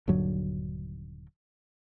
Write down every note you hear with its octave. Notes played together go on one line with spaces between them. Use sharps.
D#1 G2 D3 F#3